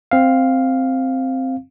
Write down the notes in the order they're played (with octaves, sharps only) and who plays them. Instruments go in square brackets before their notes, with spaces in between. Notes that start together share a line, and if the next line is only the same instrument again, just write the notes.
[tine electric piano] C4 F5